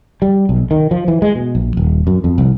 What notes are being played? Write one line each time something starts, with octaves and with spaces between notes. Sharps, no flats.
G3
B1
D#3
F3
E3
G#3
B2
A#1
D#1
F#2
F2
C2